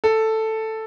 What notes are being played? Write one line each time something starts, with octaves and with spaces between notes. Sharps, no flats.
A4